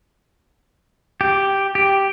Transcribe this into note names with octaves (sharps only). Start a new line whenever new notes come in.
G4
G4